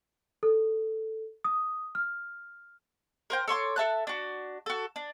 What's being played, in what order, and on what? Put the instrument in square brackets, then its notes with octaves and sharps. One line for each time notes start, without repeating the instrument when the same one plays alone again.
[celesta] A4
D#6
F6
[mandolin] A#4 C5 G5
A4 C#5 C6 D6
A4 E5 A5 F#6
D4 F#4
F#4 A4
D4